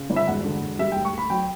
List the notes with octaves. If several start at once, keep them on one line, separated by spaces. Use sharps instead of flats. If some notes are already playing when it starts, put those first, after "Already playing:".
Already playing: C#3
G1
E5
E1 F#5
D3
E1
G3 E5
D2 G5
C#6
D2 B5
F#3 G5